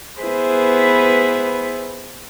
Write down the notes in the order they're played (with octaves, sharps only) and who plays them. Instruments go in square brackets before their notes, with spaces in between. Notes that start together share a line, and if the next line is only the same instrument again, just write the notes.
[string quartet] B3 E4 G#4 B4 C5